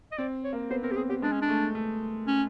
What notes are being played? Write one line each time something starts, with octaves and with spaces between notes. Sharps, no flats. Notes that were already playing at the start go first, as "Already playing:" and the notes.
D#5
C4 D5
C#5
A#3
B3 C5
C4 A#4
G4
C4 G#4
B3 G4
G#3 D4
C#4
D4
A3
A3
C#4